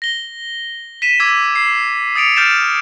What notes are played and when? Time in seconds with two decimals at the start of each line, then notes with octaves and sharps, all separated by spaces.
0.02 A#6 G7
1.02 B6 D#7 E7
1.20 D6 E6 G#6
1.56 C7
2.16 D#6 A6 C#7 D7 F7
2.36 F6 G6 A6 D7 E7